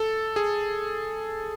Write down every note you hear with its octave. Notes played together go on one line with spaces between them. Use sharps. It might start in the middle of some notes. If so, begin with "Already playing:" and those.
Already playing: A4
G#4